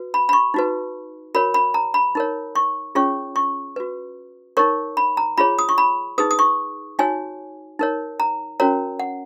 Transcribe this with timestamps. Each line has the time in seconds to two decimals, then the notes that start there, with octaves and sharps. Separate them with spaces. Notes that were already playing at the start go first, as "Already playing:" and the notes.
Already playing: F#4 B4
0.14 B5
0.29 B5
0.33 C#6
0.54 D#4 F#4 B4
1.35 F#4 A#4 C#5 B5
1.54 B5
1.74 A#5
1.94 B5
2.15 D#4 A#4 C#5
2.55 C#6
2.95 C#4 F4 G#4 C#5 C#6
3.36 C#6
3.76 F#4 B4
4.57 D#4 A#4 C#5 C#6
4.97 B5
5.17 A#5
5.38 F4 G#4 C#5 B5
5.59 D#6
5.69 C#6
5.78 B5
6.18 D#4 G#4 B4 D#6
6.31 D#6
6.39 C#6
6.99 D#4 F#4 C#5 G#5
7.79 D#4 A#4 C#5
8.20 A#5
8.60 C#4 F#4 A#4 C#5 A#5
9.00 F#5